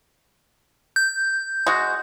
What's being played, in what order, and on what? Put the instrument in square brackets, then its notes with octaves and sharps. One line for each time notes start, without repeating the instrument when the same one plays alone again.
[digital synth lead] G6
[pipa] G#3 F#4